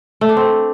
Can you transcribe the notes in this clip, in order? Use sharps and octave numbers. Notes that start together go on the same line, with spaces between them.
A3
D4
C4